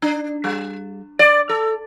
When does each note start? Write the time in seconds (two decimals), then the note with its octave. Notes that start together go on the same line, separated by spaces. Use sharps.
0.02 D4
0.44 G3
1.19 D5
1.49 A4